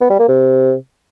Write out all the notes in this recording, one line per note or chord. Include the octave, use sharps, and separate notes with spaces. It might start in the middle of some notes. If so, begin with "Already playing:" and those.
B3
G3
A#3
C3